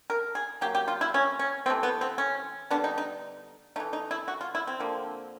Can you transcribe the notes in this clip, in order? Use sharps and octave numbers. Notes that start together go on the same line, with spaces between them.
A#4
G#4
C#3 F#3 A#3 G4
G4
F4
E4
C#4
C#4
C3 E3 A3 C4
B3
C4
C#4
D3 G3 B3 D4
D#4
D#4
E3 A3 D#4
D#4
E4
F#4
F4
E4
C4
D3 F3 A#3